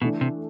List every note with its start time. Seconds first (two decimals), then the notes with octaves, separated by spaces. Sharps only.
0.01 B2 E3 A3 D4
0.21 C3